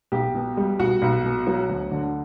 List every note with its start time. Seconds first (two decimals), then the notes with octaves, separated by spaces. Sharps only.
0.12 B1 G4
0.35 B2
0.57 G3
0.79 B1 F#4
1.02 B1
1.24 B2
1.47 F#3
1.69 D2
1.91 D3